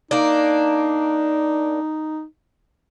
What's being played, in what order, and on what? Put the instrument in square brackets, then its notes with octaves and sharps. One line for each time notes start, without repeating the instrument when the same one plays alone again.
[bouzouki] A#3 D4 [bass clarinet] D#4